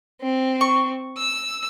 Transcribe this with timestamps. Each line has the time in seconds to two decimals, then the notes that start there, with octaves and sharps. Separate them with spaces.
0.22 C4
0.61 C#6
1.18 E6